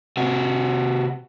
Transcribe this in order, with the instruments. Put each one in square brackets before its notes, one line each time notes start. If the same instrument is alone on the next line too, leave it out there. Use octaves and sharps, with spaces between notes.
[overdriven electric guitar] C3 F#4